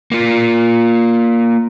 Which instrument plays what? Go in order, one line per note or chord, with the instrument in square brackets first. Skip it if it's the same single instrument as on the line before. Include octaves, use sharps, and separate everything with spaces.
[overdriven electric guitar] A#3 F4